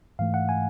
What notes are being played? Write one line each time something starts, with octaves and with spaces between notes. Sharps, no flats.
G#2 E3 A3 F5
F#5
G#5